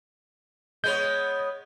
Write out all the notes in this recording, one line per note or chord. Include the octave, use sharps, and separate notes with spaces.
G#3 B3 C#5 G6